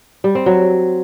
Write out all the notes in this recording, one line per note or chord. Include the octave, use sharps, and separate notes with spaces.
G3
C4
F#3